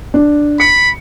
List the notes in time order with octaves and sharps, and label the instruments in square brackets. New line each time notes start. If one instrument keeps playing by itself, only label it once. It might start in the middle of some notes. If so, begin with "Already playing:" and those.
[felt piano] D4
[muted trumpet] B5 [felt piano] C#7